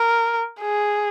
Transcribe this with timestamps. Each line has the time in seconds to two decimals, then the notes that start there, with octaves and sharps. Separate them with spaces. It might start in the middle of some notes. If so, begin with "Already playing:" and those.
Already playing: A#4
0.60 G#4